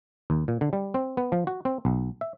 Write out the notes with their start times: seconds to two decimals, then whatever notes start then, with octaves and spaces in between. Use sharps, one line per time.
0.30 D#2
0.48 A#2
0.61 D3
0.73 G3
0.94 C4
1.17 B3
1.32 F3
1.47 F#4
1.65 C4
1.85 B1
2.21 E5